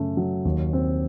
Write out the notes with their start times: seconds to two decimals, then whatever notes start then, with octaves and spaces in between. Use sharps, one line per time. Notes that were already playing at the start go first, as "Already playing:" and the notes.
Already playing: F#2 C#3 A3
0.17 F#3
0.45 D#2
0.73 C4